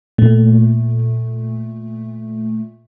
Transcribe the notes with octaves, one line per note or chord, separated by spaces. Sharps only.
A#2 A3